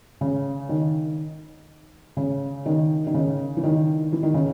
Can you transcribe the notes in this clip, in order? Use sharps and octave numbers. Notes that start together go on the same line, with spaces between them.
C#3
D#3
C#3
D#3
D#3
C#3
E3
D#3
E3
D#3
C#3